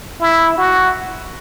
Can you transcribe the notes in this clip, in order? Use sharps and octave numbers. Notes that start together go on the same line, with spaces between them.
E4
F#4